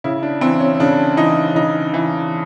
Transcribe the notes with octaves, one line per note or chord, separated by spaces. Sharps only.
C#3 E4
D4
E3 C4
C#4
C#3 D4
E3 D#4
C#3 D#4
E3